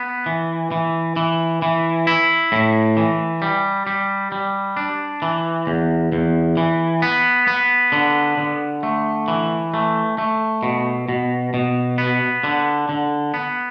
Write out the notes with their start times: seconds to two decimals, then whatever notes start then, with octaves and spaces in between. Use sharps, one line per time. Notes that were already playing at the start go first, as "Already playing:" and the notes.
Already playing: B3
0.26 E3
0.71 E3
1.16 E3
1.62 E3
2.07 E4
2.52 A2
2.97 E3
3.42 G3
3.87 G3
4.32 G3
4.77 D4
5.22 E3
5.67 E2
6.12 E2
6.57 E3
7.02 B3
7.47 B3
7.92 D3
8.37 D3
8.83 A3
9.28 E3
9.74 A3
10.18 A3
10.63 B2
11.09 B2
11.54 B2
11.98 B3
12.44 D3
12.89 D3
13.34 B3